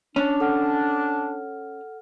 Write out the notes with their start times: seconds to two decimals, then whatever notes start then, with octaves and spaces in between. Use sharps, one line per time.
0.16 C#4 D4
0.40 A4 F#5 F6